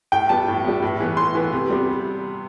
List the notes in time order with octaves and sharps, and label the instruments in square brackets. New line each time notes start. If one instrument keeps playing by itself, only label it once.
[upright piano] A2 G5
G3 B3 A5
A2
G3 B3
A2
E3 B3
A2 C6
E3 B3
C3
G3 B3